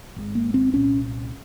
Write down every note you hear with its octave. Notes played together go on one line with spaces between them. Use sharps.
G#1 G#2
A#3
C4
C2 A#2 C#4